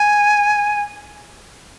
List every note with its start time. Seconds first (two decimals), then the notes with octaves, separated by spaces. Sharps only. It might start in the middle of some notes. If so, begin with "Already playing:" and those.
Already playing: G#5